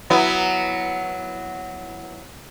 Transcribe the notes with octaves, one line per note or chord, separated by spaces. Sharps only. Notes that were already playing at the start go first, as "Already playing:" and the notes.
F#3 B3 E4